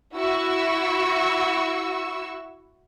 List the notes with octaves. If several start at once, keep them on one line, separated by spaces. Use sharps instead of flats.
E4 F#4 C#6 E6